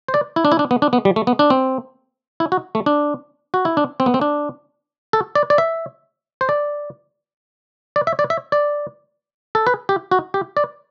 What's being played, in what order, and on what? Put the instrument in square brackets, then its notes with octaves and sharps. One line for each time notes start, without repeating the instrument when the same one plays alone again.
[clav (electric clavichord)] C5
D5
E4
D4
E4
D4
B3
D4
B3
G3
A3
B3
D4
C4
E4
F#4
A3
D4
F#4
E4
D4
C4
B3
C4
D4
A4
D5
D5
E5
C5
D5
D5
E5
D5
E5
D5
A4
B4
G4
F#4
G4
D5